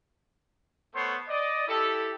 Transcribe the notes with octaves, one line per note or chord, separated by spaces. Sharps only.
A3 B3 C5 C#5 C6
D5 D#5
E4 G4 A4